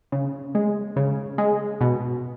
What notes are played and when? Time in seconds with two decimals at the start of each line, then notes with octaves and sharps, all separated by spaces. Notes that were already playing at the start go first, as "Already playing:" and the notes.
0.12 C#3
0.55 G#3
0.96 C#3
1.38 G#3
1.81 B2